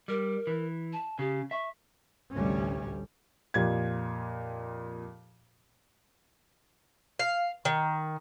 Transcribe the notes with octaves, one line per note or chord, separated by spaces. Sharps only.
G3 A#4
E3
A5
C#3 G4
E5 C#6
A1 D2 C3 G3 C#4
F2 A#2 F4 G4 G#6
F5
D#3